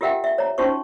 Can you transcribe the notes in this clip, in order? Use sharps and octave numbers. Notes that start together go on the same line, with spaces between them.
F4 G4 A#4 E5 F#5 G5
E5
C#5 A#5
C#4 D#4 F4 F#4 C5 C#6